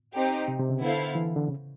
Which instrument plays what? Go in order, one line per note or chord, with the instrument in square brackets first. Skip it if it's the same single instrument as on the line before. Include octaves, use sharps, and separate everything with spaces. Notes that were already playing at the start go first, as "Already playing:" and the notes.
[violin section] C4 D#4 G4
[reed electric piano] C3
C3
C#3
[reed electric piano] D3 [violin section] B3 E4 A4 C5 F5
[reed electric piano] E3
D3
C#3